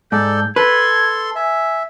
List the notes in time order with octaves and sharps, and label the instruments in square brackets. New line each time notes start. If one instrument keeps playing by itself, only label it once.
[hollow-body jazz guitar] G#2 [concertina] A4 D5 [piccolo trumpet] G6
[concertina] A4 C6 [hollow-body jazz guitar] B4 [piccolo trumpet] G#6
[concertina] E5 [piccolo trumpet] G#5